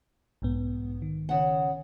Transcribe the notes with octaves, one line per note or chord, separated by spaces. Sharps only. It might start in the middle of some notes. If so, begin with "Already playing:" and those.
B1 G#2 B3
D#3
C#3 F#5